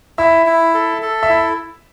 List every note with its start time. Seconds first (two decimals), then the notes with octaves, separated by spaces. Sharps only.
0.18 E4 E5
0.46 E4
0.74 A4
1.02 A4
1.23 E5
1.29 E4